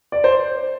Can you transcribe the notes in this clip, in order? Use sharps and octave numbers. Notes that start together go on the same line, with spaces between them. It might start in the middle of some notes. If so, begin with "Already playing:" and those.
D5
C5